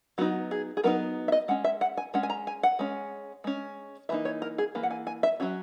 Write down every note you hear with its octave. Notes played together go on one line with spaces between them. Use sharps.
F#3 B3 D#4 F#4
G#4
G#4
F#3 B3 D#4 A#4
E5
D#5
G#3 C#4 F#5
E5
F#5
G#5
G#3 C#4 F#5
G#5
A#5
G#5
F#5
G#3 C#4
G#3 C#4
E3 A#3 D#4 E5
C#5
A#4
G#4
E3 A#3
F#5
G#5
G#5
E5
F#3 C#4 F#4